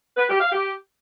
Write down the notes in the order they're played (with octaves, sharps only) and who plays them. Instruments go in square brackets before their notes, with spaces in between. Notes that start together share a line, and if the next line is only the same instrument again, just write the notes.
[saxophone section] B4
G4
F5
G4